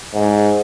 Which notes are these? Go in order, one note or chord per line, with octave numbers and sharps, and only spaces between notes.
G#2